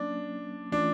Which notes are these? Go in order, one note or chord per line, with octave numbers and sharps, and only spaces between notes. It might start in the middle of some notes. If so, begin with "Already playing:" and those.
Already playing: F#3 A#3 C#4 D4
E3 A3 C#4 D4 F4